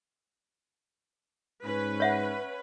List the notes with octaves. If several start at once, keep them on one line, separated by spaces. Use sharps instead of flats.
G#2 C#4 B4
C#5 E5 F#5